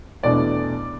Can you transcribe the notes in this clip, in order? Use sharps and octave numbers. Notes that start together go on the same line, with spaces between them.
E2 B2 A3 D4 D5